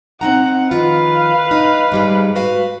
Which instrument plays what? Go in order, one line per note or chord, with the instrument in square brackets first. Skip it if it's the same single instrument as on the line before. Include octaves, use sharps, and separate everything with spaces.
[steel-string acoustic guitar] C4 D#4 A#5 [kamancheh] F#5
[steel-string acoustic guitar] D#3 F3 F4 [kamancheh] B4 F5
[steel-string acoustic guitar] D#4
G#2 G3 G#3
F#4 B4 F5